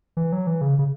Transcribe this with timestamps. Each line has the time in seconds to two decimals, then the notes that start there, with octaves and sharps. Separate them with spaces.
0.17 E3
0.32 F#3
0.47 E3
0.61 C#3
0.79 C#3